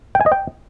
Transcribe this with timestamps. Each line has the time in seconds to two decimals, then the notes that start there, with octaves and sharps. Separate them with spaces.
0.15 G5
0.21 G#5
0.26 D#5
0.32 G5